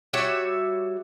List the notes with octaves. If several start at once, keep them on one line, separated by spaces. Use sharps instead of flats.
G3 F#4 C#5 E5